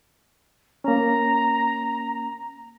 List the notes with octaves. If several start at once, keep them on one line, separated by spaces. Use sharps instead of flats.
A#3 C#4 A#5